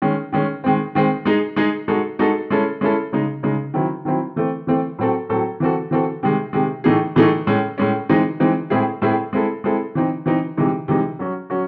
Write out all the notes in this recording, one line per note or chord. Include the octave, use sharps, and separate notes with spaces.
D#3 G#3 C#4
D#3 G#3 C#4
D#3 G#3 C4
D#3 G#3 C4
G#3 D#4 G#4
G#3 D#4 G#4
G#3 D#4 F#4 A4
G#3 D#4 F#4 A4
G#3 C#4 E4 A4
G#3 C#4 E4 A4
C#3 G#3 D#4
C#3 G#3 D#4
D#3 F#3 C4 E4
D#3 F#3 C4 E4
E3 A3 C4
E3 A3 C4
A2 F#3 C4 F#4 A4
A2 F#3 C4 F#4 A4
E3 C4 F#4 A4
E3 C4 F#4 A4
C3 D#3 G#3
C3 D#3 G#3
A2 E3 A3 D#4 G#4
A2 E3 A3 D#4 G#4
A2 G#3 C#4
A2 G#3 C#4
E3 G#3 C4 D#4
E3 G#3 C4 D#4
A2 G#3 C4 E4 G#4
A2 G#3 C4 E4 G#4
G#3 C4 E4 A4
G#3 C4 E4 A4
E3 C4 D#4
E3 C4 D#4
C3 E3 G#3 D#4
C3 E3 G#3 D#4
F#3 C#4 F#4
F#3 C#4 F#4